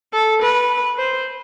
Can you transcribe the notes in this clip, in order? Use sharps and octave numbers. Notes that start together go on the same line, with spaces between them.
A4
B4
C5